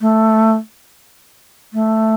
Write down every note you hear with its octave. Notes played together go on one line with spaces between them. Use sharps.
A3
A3